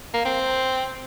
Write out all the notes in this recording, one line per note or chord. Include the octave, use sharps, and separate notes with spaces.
A#3
C4